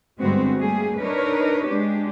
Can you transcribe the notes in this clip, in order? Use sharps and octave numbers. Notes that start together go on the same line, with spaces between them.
G2 D3 G#3 B3 C4 F#4
G3 A3 A#3 G#4
D4 D#4 A#4 B4 C#5
G#3 D4 G4